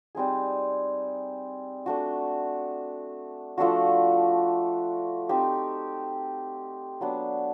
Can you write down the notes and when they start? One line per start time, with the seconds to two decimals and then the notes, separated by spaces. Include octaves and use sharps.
0.15 G3 C4 D#4 G#4
1.86 A3 D4 F#4
3.58 F3 A3 D4 F#4
5.29 C4 D#4 G4
7.01 F#3 B3 D4